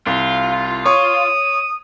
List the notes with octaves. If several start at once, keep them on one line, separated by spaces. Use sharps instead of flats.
C2 F4
C#5 C#6 D#6